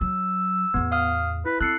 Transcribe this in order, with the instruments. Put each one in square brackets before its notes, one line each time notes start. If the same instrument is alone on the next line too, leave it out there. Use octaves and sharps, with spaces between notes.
[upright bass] F#3 [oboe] E6
[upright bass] E2 A2 [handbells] B3
[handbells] F5 D#6 F6
[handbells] E4 [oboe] B4
[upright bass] C4 [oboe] A4 [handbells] F#6 C7 C#7